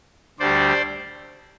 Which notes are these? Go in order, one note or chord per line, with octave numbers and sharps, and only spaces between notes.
D2 D3 G3 C5 D5